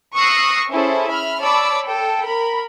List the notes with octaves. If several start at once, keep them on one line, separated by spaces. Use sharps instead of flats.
C#6 D#6 E6 F#6 A#6 C7
C#4 E4 G#4 A4 C5
E5 B5 F6
C#5 D5 A5 B5 D6 E6
A4 G5
A#4 B5